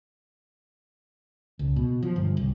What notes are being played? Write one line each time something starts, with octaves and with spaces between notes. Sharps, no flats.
C#2
B2
F3
G1
C2